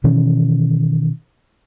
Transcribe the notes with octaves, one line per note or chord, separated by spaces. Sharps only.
B2 D#3 E3 C#4